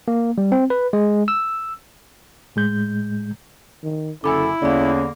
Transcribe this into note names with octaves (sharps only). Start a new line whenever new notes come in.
A#3
G3
C4
B4
G#3
E6
A2 G#3 G6
D#3
F#1 D3 C#4 E4 A4 G#5 B5 D6
E2 D3 A#3 C#4 D5 B5